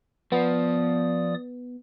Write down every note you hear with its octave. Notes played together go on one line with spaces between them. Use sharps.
F3 B3 D5 D#6